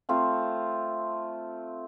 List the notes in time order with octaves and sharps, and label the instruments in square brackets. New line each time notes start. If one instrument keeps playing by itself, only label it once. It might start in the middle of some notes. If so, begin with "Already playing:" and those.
[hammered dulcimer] A3 C4 F4